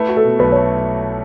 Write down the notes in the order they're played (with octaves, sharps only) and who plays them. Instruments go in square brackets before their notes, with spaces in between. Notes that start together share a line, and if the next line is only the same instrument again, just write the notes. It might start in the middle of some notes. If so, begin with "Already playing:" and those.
Already playing: [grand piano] A3 E4 [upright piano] B4
[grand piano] F#4
[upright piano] A4
[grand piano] B2
[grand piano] B1 [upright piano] B4
[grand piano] A3 [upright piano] C#5